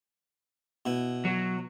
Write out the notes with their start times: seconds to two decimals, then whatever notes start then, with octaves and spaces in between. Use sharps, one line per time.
0.86 B2 E4
1.25 F#3